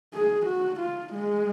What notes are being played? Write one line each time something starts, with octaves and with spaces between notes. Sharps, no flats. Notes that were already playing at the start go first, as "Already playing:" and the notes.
G#4
F#4
F4
G#3